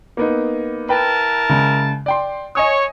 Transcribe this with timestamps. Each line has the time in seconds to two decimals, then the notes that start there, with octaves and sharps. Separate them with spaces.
0.17 A#3 B3 D#4
0.89 E4 A#4 B4 G5 A5
1.49 C#3 G#3
2.06 D5 G5 C6
2.55 C#5 D#5 G#5 D#6